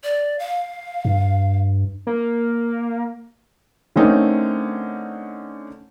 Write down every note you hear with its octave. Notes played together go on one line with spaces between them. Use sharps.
D5
F5
G2
A#3
D3 A3 C4 C#4 D#4 A#4